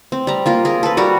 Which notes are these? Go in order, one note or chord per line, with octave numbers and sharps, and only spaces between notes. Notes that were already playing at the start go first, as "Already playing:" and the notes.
C4
G3 A#5
A#3 F4 A#4
G#4 A#4
A4 B4
G3 F#4 A#4